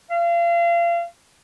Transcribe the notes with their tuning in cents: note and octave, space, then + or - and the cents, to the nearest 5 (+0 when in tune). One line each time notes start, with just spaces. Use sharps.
F5 -35